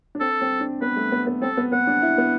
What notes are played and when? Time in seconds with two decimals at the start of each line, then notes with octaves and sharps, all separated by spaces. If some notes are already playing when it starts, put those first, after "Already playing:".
0.15 D4
0.20 C4 A4
0.41 C4
0.61 D4
0.81 B3 B4
0.97 A3
1.12 B3
1.27 B3
1.42 C4 A4
1.57 B3
1.72 B3 F#5
1.87 D4
2.02 E4
2.18 B3